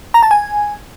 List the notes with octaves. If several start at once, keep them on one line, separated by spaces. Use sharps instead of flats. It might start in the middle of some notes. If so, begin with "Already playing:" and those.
A#5
A5
G#5